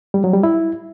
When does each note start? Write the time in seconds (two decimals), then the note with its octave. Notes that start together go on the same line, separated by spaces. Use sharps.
0.14 G3
0.24 F#3
0.34 G3
0.43 E4